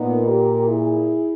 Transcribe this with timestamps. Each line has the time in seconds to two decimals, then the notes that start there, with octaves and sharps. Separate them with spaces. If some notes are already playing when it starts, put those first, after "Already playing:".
Already playing: A#2 B3 D#4
0.26 G4 A#4
0.66 E4 G#4